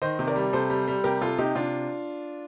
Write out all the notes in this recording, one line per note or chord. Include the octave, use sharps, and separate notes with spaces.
D#3 C5 D#5
C3
A#4 D5
G3
C3 A4 C5
G3
G3
C3 G4 A#4
C3 F4 A4
C3 D#4 G4
C3 D4 F4